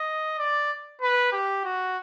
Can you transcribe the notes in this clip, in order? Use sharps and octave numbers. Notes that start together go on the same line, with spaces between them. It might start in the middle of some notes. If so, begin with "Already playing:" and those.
Already playing: D#5
D5
B4
G4
F#4